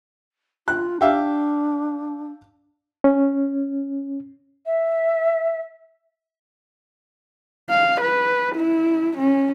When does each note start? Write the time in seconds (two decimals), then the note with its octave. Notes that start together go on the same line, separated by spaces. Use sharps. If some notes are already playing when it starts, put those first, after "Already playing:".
0.68 F4 F#6
1.01 D4 G4 E5 F5
3.04 C#4
4.66 E5
7.70 F5
8.01 B4
8.55 E4
9.18 C#4